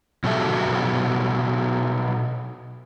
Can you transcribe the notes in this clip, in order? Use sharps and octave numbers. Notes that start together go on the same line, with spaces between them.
B2 F#3 F#4 G4 A4 E5